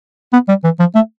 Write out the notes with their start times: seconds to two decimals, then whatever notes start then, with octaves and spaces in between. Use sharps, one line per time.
0.33 B3
0.48 G3
0.64 E3
0.80 F3
0.95 A3